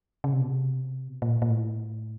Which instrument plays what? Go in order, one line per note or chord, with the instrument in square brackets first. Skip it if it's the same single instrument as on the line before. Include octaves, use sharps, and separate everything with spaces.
[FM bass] C#3
C3
B2
C3
B2
A#2
A#2
A2